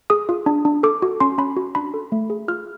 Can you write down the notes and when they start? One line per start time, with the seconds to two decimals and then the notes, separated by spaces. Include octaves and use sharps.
0.10 G#4 D#6
0.29 F4
0.46 D4
0.65 D4
0.83 A4 D6
1.02 F#4
1.20 C#4 C6
1.38 C#4 B5
1.57 F#4
1.75 D4 B5
1.94 A4
2.12 A3
2.30 G#4
2.48 F4 F6